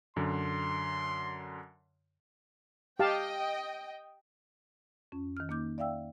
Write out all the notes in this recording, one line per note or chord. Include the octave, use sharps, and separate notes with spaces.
F#2 D3 C6
G4 D#5 F5 G5 A5
F2 C#4
D#3 F6
A#3 D#4 D6 G6
D5 E5 F5 G5 E6